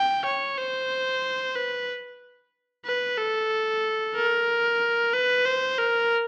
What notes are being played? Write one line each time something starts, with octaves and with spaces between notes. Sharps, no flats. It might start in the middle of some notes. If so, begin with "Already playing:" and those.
Already playing: G5
C#5
C5
B4
B4
A4
A#4
B4
C5
A#4